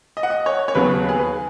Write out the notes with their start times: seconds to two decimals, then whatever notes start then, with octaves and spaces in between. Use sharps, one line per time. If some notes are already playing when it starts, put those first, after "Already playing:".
0.17 D#5
0.23 F#5
0.30 D#5
0.46 C#5
0.68 C#5
0.75 D#2 C#3 F#3 B3 B4
1.09 G#4
1.19 B4